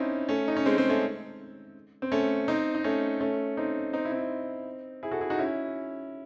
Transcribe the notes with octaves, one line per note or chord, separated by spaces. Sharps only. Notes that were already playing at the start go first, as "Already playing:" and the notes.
Already playing: C4 C#4 D#4 E4
A3 C#4
D#4
C#4
G#3 C4
G#3 C4
A3 C#4
C4
A3 C#4
C4 D#4
D#4
A3 C#4
A3 C#4
C4 D#4
C4 D#4
E4
C4 D#4
E4 G#4
F#4 A4
E4 G#4
D#4 F#4
C#4 E4